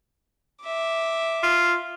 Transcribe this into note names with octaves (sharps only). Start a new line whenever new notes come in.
E5 D6
F4